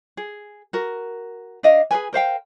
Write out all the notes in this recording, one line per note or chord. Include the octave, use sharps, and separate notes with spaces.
G#4
F#4 A#4
D4 D#5 F5
G#4 A#4 B4 G#5
A#4 C5 F5 G5